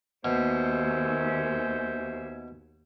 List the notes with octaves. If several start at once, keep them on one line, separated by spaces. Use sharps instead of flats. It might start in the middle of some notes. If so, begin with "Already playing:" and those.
D#2 B2 C5 E5 G#5